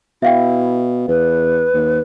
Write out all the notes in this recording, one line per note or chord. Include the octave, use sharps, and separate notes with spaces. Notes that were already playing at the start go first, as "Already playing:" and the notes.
B2 E4 E5 F5 G5
E2 B4
D#2